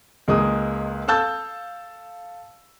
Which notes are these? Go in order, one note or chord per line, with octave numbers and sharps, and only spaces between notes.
C#2 G#3 A#3 D#6
A4 F5 A5 E6 G6 A6